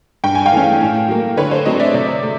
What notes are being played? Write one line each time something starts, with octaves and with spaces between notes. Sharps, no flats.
G2 G5
G#5
F5 G5
E3 A3 C#4
A2
F#3 A#3
D3 B4 C#5
C5
F#3 A3 C4 C#5 D#5
D5 E5
C3
A3